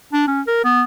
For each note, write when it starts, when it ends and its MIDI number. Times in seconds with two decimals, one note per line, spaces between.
0.13 0.27 62
0.28 0.41 61
0.47 0.60 70
0.64 0.83 59